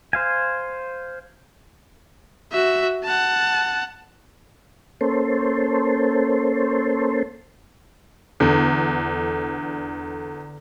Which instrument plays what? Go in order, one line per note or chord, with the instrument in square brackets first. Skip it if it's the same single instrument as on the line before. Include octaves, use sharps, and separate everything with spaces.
[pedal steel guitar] C5 F5 G#5
[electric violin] F#4 E5
F#5 A5
[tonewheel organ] A#3 C#4 A4 C5
[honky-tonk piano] E2 [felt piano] D3